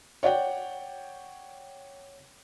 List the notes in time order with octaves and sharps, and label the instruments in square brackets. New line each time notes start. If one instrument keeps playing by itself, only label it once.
[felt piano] C#5 D5 F#5 G5